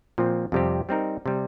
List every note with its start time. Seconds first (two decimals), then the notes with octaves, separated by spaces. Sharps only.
0.18 A#2 F3 C4
0.52 F2 C3 G3 C4 G4
0.89 G3 C4 D#4 A#4
1.26 C3 G3